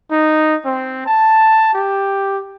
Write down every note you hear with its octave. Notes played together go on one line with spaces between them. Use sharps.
D#4
C4
A5
G4